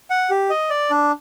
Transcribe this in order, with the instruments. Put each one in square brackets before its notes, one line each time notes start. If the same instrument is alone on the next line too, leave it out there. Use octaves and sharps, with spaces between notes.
[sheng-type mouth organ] F#5
G4
D#5
D5
D4